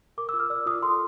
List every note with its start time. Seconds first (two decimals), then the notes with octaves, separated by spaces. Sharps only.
0.18 A#4 D6
0.29 F4 E6
0.40 F6
0.50 D5 E6
0.66 F4 D#6
0.83 A4 C6